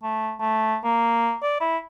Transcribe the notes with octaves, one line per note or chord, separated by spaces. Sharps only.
A3
A3
A#3
D5
E4